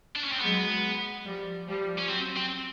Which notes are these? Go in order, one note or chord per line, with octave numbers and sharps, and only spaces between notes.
D4
C#4
C4
F#3 G#3 B3
F3 G3
F3 G3
C#4
F#3 C4
C4